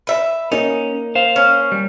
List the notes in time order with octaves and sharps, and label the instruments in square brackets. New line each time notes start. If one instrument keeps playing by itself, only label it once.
[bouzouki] B4 E5
[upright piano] A#3 [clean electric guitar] C#4 [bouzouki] D#4
[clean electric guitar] C5 F5
[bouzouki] C#4
[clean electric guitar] G3